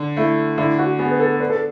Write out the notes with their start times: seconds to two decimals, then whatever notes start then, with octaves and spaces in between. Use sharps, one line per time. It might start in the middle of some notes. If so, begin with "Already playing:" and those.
Already playing: D3
0.17 A3 E4
0.58 D3 E4
0.79 F#4
0.99 B3 G#4
1.11 B4
1.20 A4
1.40 D4 B4
1.50 A4